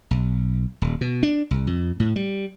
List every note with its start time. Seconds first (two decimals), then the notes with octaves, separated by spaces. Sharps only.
0.11 B1
0.82 D#1
1.01 B2
1.23 D4
1.51 C2
1.67 F2
2.00 A2
2.16 G3